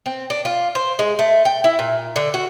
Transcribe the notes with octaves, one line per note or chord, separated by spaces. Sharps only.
C4
D4
F4
C5
G#3
A3
G5
E4
A#2
D3
F#4